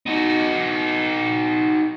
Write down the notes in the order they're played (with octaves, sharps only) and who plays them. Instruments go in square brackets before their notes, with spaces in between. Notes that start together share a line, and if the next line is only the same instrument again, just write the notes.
[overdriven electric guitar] D#4 F#4